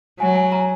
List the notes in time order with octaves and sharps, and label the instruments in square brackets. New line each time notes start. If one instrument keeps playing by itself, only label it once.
[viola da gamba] F#3 [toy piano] G#5
[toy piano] G#5
A#5